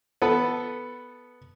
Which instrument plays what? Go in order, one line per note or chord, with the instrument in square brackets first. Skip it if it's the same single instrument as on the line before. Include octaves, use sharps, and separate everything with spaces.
[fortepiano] B3 A4 B4